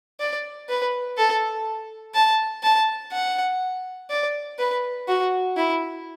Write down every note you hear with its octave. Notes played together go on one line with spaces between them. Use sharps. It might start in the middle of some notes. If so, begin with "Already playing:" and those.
D5
B4
A4
A5
A5
F#5
D5
B4
F#4
E4